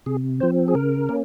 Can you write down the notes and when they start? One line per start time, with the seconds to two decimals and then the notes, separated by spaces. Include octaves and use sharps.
0.06 C3 G#4
0.40 F3 C4 C5
0.68 G#4
0.75 C#3 A#4
1.09 A#3 C#4